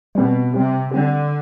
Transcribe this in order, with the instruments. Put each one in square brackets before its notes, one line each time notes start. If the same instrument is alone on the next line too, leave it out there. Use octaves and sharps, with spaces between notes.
[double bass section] B2 [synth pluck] G3 C4 G4
[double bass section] C3 [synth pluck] G3 C4 G4
[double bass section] D3 [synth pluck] G3 C4 G4